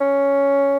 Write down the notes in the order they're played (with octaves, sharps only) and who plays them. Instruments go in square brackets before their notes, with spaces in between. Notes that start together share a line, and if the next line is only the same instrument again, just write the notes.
[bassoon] C#4